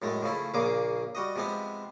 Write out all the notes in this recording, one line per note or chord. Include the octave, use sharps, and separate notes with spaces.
F#2 A2 G#3 A3
C#3 F3 A3 E4
A#1 A#2 C#3 A#3 G#4 D6
G3 F#4 D#5
C3 F3 G#3 B3 C4